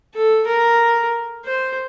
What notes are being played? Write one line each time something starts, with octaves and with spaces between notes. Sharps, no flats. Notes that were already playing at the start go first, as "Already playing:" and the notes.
A4
A#4
C5